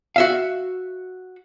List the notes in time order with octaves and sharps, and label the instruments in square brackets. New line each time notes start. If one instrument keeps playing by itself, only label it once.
[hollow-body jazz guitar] F#4 E5 F5